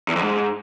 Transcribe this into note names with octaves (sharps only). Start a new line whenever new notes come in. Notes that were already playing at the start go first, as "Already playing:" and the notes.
E2
F2
G#2